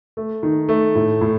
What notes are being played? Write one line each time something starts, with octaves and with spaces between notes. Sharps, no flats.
A3
D#3
A3
A2
A2